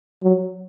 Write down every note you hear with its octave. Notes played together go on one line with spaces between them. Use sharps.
F#3